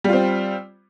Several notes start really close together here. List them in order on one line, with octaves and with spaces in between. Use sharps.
G3 F4 C4